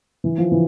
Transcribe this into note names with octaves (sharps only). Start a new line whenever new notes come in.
E3
F3
E3